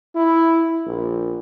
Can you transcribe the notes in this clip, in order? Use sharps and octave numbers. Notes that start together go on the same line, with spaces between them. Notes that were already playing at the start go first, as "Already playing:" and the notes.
E4
A#1